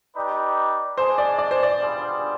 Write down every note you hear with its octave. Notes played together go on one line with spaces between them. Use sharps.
D#4 G4 B4 D5
G#3 D4 G#4 C5
D5
D5
C5
D5
G3 B3 F4 G#4 C5